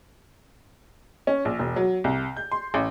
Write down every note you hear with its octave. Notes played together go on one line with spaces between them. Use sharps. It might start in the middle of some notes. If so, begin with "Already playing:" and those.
C#4
A#1
E1
F#3
C2
G6
C6
A1